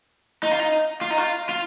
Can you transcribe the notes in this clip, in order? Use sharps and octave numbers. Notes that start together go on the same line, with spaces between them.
D#4
F4
D#4
F4
D#4
F4
F4